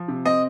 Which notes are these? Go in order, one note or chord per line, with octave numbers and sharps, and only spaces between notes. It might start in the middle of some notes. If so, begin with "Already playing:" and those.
Already playing: F3
C3
C4 D#5